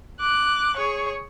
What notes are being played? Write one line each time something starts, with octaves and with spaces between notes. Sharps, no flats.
D6 F#6
G#4 C#5